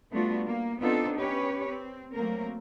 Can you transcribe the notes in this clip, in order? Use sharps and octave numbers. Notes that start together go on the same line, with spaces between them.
G3 A3 B3 D4 F4 F#4
A#3
B3 C4 D4 D#4 F4 A4
C#4 G4 B4 C#5
C4
F#3 A3 A#3 C4 A#4